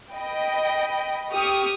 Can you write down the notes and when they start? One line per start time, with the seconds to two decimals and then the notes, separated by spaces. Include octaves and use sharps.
0.14 D#5 G5 B5
1.33 G4 C#6 D#6 F6